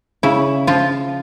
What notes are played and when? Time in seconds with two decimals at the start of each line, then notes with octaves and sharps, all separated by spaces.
0.23 C#3 E4
0.67 F3 F4